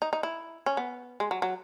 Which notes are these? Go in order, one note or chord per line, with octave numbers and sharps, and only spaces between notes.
D#4
D#4
E4
C#4
B3
G#3
F#3
F#3